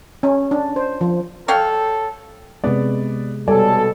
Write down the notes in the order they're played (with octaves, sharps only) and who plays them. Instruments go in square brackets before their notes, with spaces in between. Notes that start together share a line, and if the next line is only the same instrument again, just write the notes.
[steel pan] C#4
D4
C5
F3
[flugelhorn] A4 [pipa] C#5 F5 G5
[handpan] C3 G#3 [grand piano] B3 D5
[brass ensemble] B2 A4 [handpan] G3 [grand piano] C#5 D5 G#5